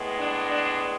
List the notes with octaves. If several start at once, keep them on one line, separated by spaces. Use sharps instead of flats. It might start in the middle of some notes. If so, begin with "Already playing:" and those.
Already playing: A2 G#3 B3
D4
D4